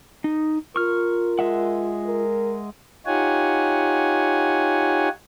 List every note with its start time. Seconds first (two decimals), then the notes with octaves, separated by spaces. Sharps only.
0.24 D#4
0.76 F4 A#4 C#6 F6
1.39 G#3 E5 F#5
2.06 A#4
3.06 D#4 F4 G4 C#5 F#5 G#5